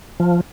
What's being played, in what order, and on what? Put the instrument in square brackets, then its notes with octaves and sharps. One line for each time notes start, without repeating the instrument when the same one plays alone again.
[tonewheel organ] F3